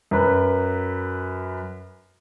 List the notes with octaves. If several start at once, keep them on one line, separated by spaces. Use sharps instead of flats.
F#2 B4